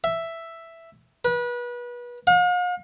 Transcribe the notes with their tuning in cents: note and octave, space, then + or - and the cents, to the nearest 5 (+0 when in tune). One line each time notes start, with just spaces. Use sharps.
E5 +5
B4 -30
F5 +45